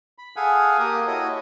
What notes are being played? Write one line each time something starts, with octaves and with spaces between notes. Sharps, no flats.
B5
G#4 A4 F5 F#5 G#5
A#3 G4 A#4 D#6
E4 F#4 A4 C#5 D#5